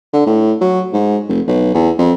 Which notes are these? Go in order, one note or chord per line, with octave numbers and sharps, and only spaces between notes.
D3
A2
F#3
G#2
F1
B1
E2
F2